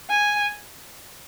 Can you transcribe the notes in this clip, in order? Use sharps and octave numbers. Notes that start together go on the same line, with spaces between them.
G#5